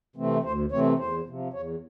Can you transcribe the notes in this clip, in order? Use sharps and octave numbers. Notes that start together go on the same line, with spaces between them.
C3 E3 A3 C4
D2 C5
C3 E3 A3 C4 C#5
E2 C5
C3 F3
E2 C#5